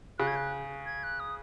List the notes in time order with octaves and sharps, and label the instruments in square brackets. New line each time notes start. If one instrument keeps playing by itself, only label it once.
[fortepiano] C#3 [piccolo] F#6
[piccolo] G#6
F#6
G#6
F#6
D#6